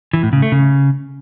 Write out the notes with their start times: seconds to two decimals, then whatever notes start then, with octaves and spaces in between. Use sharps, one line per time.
0.13 E3
0.23 A2
0.33 C#3
0.42 A3
0.52 C#3